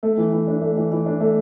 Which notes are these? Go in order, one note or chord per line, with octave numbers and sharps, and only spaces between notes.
A3
E3
E3
D4
A3
E3
E3
D4
A3